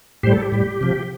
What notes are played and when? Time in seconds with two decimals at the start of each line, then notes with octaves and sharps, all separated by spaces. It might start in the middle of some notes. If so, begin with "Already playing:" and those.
0.23 A2 G3 G4 C5
0.33 A4
0.42 G4
0.52 A2 G3
0.81 C3 F3